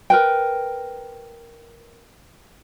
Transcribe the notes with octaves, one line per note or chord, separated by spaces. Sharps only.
A#4 B4 G5